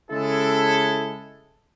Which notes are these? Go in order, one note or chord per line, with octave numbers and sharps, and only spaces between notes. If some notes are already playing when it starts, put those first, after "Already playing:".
C#3 G#3 C#4 E4 A4